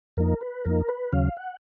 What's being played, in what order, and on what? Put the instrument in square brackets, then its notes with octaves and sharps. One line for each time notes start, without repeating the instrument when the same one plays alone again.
[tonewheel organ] F2 F3 A#3 D#4 A#4
B4
F2 F3 A#3 D#4 A#4
B4
D#2 C#3 F#3 C#4 F5
F#5